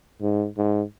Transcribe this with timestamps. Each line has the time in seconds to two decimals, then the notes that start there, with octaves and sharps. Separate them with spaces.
0.22 G#2
0.57 G#2